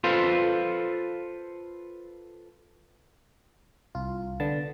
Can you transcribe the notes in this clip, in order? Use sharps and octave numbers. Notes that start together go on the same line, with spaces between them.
F4 A4 B4 C5 F5
C2 F4
D3 B3 A5